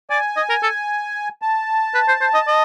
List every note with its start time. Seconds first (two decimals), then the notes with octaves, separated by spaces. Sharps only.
0.10 D5 G#5
0.37 D#5
0.49 A#4
0.63 A4
1.42 A5
1.95 B4
2.08 C5
2.21 C5
2.34 D#5
2.47 D#5